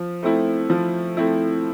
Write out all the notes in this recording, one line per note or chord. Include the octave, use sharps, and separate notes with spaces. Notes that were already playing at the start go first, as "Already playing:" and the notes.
Already playing: F3
A3 C4 E4
F3
A3 C4 E4